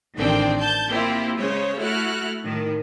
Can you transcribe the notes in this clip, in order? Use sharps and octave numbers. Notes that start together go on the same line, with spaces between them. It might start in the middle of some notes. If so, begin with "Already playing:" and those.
A1 D3 D#3 C4 D4 G5
A5 G6
A#3 C4 E4 F4 G4
C#3 G#3 C5 C#5
A3 E4 F#4 F6 F#6
A2 D#3